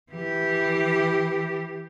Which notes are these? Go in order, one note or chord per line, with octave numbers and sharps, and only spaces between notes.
E3 G4